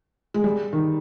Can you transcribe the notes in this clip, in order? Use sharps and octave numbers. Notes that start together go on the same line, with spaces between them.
G#3
G3
D#3